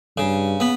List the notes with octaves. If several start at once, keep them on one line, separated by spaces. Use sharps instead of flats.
G2 C#3
B3